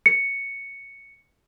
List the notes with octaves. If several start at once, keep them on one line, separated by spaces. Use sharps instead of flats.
C#7